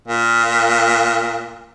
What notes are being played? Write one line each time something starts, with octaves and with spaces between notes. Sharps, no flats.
A#2